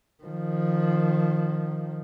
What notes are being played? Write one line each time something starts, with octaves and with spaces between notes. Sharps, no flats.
D#3 F3